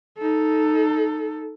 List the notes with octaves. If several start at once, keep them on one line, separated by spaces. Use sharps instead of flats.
D#4 A4